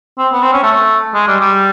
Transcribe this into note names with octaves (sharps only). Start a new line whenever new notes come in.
C4
B3
C4
C#4
A3
G#3
G3
G3